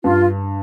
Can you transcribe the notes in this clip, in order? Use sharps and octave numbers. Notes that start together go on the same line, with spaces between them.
G2 F4